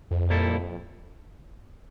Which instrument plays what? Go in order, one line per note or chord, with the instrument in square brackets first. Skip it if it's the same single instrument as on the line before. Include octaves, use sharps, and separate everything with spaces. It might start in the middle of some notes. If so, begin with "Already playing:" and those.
[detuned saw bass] F2
[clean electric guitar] A#2 G3 A#3 E4 A4